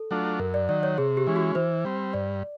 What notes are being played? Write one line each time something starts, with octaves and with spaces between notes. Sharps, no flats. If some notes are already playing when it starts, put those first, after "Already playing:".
Already playing: A4
F#3 A3 D4 F4
F#2 A#4
D5
D#3 F#3 D5
C#5
C3 G#4
G4
E3 G#3 C#4
F#4
E3 C5
G3 C4
G2 D5